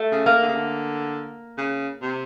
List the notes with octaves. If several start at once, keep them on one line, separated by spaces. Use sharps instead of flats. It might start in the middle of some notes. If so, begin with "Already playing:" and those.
Already playing: A3
C#3
A#3
D3
C#3
D3
C#3
C3